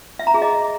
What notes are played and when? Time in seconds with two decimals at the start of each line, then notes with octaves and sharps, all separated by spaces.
0.19 E5
0.27 A#5
0.34 G#4
0.42 D#5